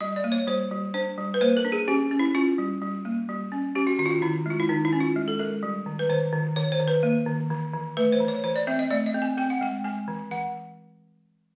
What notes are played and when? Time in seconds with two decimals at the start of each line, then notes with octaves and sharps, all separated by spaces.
0.01 G3 D#5
0.16 D5
0.24 A#3
0.32 C#5
0.47 G3 C5
0.71 G3
0.94 D4 C5
1.18 G3
1.34 B4
1.41 A#3 C5
1.57 A#4
1.65 D4
1.72 G#4
1.88 C#4 G4
2.11 C#4
2.19 E4
2.35 C#4 F4
2.58 G3
2.82 G3
3.05 A#3
3.29 G3
3.52 C#4
3.75 C#4 G4
3.87 F#4
3.99 D#3 F#4
4.06 F4
4.11 F#4
4.22 D#3 E4
4.46 G#3 F4
4.60 E4
4.69 D#3 D#4
4.85 E4
4.93 C#4
5.00 F4
5.16 G#3
5.28 A4
5.39 G#3 A#4
5.63 G3
5.86 D#3
5.99 B4
6.09 D#3 C5
6.33 D#3
6.56 D#3 C#5
6.72 C5
6.80 D#3
6.88 B4
7.03 A#3
7.26 D#3
7.50 E3
7.74 E3
7.97 A3 B4
8.12 C5
8.20 E3
8.28 C#5
8.44 E3 C5
8.56 D5
8.67 C4 E5
8.79 D#5
8.91 A3 D5
9.06 D#5
9.14 C4
9.22 G#5
9.37 C4 G5
9.50 F#5
9.61 G#3 G5
9.84 G#3 G#5
10.08 E3
10.31 E3 F#5